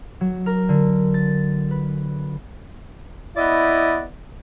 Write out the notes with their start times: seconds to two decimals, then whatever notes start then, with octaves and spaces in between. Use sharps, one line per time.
0.21 F#3
0.46 A#4
0.69 D3
1.14 A6
1.71 B4
3.37 B3 E4 D5 D#5